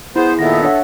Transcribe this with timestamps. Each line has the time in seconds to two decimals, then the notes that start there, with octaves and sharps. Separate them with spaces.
0.16 B3 E4 G#4 C5
0.39 A#2 D#3 B3 A4 E5 A#6
0.62 D4 C#5 F#5